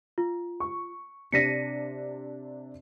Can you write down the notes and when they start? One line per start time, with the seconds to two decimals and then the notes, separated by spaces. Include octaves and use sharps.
0.18 F4
0.60 C#6
1.32 C3 D4 A#6 B6 C#7 D#7